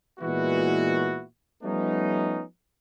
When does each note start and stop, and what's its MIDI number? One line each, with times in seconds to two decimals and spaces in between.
0.20 1.22 46
0.20 1.22 52
0.20 1.22 56
0.20 1.22 59
0.20 1.22 64
0.20 1.22 66
1.63 2.42 53
1.63 2.42 55
1.63 2.42 57
1.63 2.42 59
1.63 2.42 61
1.63 2.42 63